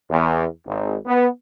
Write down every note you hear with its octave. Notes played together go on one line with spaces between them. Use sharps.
E2
G#1
B3